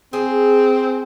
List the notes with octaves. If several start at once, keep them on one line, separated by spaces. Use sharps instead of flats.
C4 G#4